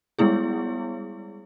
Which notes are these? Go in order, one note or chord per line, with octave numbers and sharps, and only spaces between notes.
G3 G#3 B3 E4 G#4